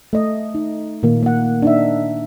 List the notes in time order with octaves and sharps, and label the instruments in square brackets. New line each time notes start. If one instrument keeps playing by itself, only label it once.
[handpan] A3 D#5
D#4
A#2 D#3 A#3
A#3 F#5
D4 D#4 E5